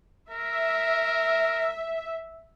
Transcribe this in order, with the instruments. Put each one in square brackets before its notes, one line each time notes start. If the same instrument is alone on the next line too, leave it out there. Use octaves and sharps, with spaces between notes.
[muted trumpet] A#4 [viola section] E5